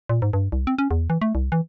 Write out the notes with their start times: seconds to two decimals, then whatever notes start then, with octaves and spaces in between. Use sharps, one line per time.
0.09 A#2
0.22 G#2
0.33 G2
0.52 C2
0.67 C4
0.78 C#4
0.91 E2
1.10 E3
1.22 A3
1.35 C2
1.52 E3